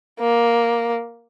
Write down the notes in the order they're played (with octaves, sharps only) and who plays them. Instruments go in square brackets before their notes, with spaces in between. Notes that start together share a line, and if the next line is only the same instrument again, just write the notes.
[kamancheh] A#3